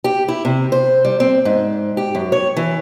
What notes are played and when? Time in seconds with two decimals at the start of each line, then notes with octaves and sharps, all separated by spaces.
0.04 G4
0.28 E4
0.45 C3
0.72 C5
1.05 G3
1.20 C4
1.45 G#2
1.97 G4
2.15 F#2
2.32 C#5
2.57 E3